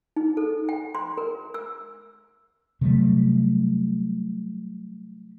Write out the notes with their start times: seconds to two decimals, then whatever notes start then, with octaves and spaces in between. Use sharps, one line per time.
0.16 D#4
0.37 A4
0.69 G5
0.95 C6
1.18 A#4
1.54 E6
2.81 C3 F#3 G3 A3